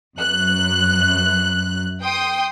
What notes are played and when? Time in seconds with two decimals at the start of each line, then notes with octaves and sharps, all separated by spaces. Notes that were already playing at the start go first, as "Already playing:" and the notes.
0.17 F#2 F#6
2.02 G5 C6 D#6